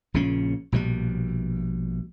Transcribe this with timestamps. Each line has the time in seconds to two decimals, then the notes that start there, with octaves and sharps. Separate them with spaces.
0.14 A#1 A#2 C#3 C#4
0.72 A#1 B2 D#3 G3